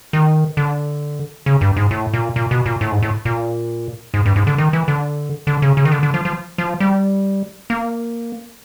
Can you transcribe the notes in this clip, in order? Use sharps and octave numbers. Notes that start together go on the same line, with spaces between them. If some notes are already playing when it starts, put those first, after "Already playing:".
D#3
D3
C#3
G2
G#2
A2
A#2
A#2
B2
A#2
A2
G#2
A2
A#2
G#2
G2
G#2
D3
D#3
E3
D3
D3
C#3
C#3
D#3
D3
D3
F3
F3
F3
G3
A#3